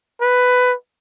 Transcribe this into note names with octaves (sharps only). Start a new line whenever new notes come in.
B4